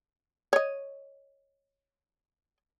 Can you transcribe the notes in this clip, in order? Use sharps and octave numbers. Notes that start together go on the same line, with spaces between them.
C#5 D#5